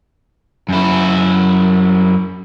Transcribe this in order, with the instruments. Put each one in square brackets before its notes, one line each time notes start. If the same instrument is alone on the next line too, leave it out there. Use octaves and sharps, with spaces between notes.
[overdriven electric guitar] F#2 E4